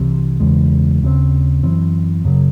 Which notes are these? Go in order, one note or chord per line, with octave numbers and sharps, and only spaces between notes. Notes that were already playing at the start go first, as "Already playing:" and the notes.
Already playing: C2 C3 E3 C4
E2 C#3 E3 G#3
D#2 C#3 G#3 C4
F#2 E3 C4
F#2 C#3 F#3